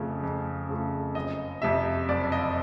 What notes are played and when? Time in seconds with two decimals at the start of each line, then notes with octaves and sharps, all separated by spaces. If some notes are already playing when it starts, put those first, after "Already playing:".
Already playing: F2 C#3 F3 A3
0.23 F2
0.69 C#3 F3 A3
1.15 F#1 D#5
1.62 F2 C3 E5
2.09 F#1 D5
2.32 D#5